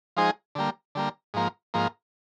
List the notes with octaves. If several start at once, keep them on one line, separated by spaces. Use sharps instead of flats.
F3 G#3 D#4 G#4 C5
D3 G3 A#3
D3 G3 A#3
G#2 F3 A#3
G#2 F3 A#3